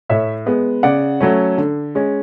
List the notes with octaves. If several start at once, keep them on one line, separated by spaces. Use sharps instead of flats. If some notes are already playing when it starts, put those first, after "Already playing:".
A2 C#5 E5
G#3 B3
C#3 D5 F#5
F#3 A3 C#4
D3
G#3 C#4